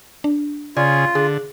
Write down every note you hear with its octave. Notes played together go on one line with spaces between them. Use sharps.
D4
C#3 F4 G#4 D5
D3 G#4